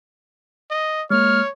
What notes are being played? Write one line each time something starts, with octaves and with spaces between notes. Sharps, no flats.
D#5
G#3 A#3 C#5 F6